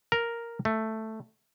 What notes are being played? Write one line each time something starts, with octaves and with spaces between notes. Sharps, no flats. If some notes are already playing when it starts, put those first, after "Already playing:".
A#4
A3